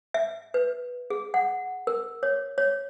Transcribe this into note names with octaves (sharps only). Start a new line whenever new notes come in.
E5
B4
G#4
F#5
A#4
C#5
C#5